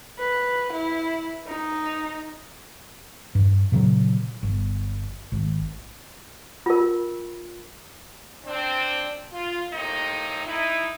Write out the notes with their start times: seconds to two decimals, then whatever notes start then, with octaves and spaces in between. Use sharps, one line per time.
0.19 B4
0.73 E4
1.47 D#4
3.35 G2
3.72 A#2 C#3 E3 F#3
4.43 G1
5.32 G#1
6.66 F4 A#4
8.45 C4 D4
9.33 F4
9.73 A2 C3 A#3 D#4
10.46 D#4 E4